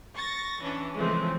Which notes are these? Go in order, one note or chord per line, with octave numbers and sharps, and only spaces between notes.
C#6 A6 A#6
E3 C#4 D4
C#3 E3 F3 G#3 A3 C4